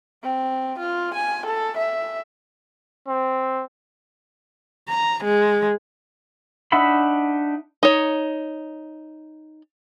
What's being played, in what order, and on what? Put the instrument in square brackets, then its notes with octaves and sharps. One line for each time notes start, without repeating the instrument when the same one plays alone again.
[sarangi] C4
F4
G#5
A4
E5
[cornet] C4
[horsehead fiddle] A#5
G#3
[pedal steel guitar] D4 D#4 E5 F#5 B5
[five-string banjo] D#4 C#5